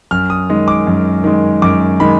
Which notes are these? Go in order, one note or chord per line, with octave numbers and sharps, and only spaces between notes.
F#2 F6
D#6
D#3 G#3
D6
F#2
D#3 G#3
F#2 D6
D#3 G#3 B5